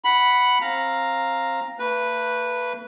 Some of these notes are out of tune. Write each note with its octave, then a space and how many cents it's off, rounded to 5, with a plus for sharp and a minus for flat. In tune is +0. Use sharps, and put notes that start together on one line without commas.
F#5 +0 B5 +0
C4 +25 F5 +0 A#5 +0
A3 +45 B4 -5